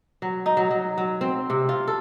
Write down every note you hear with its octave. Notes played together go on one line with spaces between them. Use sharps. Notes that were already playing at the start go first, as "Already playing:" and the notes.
F#3
D#4
F#3
F#3
F#3
C4
C3
F4
A4